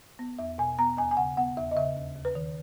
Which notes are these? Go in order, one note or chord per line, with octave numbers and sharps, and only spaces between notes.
B3
E2 E5
B2 G#5
B3 A#5
D#2 G#5
G#5
C#3 F#5
B3 F#5
E2 E5
D#5
C#3 E5
D#2
D#2
B4
D#3